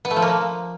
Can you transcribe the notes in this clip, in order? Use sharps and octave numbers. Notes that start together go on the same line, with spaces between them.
B3
A3
F3
A#3